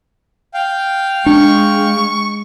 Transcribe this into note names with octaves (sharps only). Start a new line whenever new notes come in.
F5 G5
G#3 D4 C#6